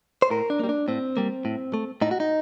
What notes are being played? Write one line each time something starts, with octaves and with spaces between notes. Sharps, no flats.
C5
A2 A#4
D4
G3 A#3
D4
A2 C4
G3 A#3
A2
A3
A2 D#4
F#4
D#4